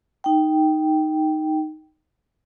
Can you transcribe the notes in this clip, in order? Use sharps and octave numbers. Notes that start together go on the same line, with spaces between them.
D#4 G5